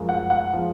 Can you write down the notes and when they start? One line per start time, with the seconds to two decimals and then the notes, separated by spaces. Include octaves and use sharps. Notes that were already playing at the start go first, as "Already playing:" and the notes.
Already playing: F#2 F3 G#3
0.09 F#5
0.30 F#5
0.53 F3 G#3